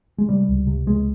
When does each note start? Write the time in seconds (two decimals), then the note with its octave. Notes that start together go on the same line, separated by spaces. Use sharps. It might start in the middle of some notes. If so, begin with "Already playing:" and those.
0.18 G#3
0.29 C3 G3
0.48 C#2
0.67 C3
0.86 C#2 G#3